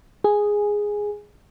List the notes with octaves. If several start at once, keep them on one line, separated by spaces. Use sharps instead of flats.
G#4